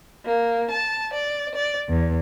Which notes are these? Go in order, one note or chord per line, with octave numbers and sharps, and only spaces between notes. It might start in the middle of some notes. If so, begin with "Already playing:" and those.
A#3
A5
D5
D5
E2